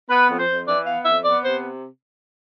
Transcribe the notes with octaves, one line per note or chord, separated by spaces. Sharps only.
B3 B4
F2
C5
F2
E3 D5
B3 F5
F2 E5
B3 D5
C3 C5